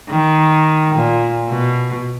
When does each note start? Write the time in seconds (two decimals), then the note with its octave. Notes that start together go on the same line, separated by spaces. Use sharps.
0.10 D#3
0.96 A#2
1.49 B2